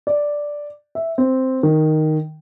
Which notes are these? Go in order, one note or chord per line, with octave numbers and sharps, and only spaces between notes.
D5
E5
C4
D#3